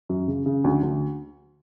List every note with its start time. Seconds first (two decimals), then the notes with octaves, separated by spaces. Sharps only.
0.09 F#2
0.28 C#3
0.46 C#3
0.64 D2
0.83 D2